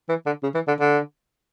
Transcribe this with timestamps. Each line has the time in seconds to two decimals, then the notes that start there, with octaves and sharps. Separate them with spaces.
0.09 E3
0.26 D3
0.43 C#3
0.54 E3
0.68 D3
0.80 D3